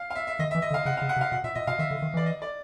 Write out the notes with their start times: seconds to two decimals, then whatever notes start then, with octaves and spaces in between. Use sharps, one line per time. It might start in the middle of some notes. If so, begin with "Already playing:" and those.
Already playing: F5
0.10 F5
0.15 E5
0.27 E5
0.39 D#3 D#5
0.51 E5
0.55 E3
0.62 D#5
0.71 D3
0.74 F5
0.86 C#3 F#5
0.97 F5
1.02 C#3
1.09 F#5
1.16 C3
1.21 F5
1.32 B2 F#5
1.44 A#2 E5
1.55 A#2 D#5
1.67 B2 F5
1.79 D#3 E5
1.91 D3
2.02 D#3
2.14 E3 D5
2.26 D#5
2.42 D5